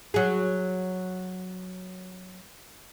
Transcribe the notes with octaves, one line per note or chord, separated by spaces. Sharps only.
F#3 G#4